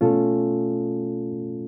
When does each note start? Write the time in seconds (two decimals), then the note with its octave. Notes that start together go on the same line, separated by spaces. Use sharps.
0.01 B2 A3 C#4 F4 A4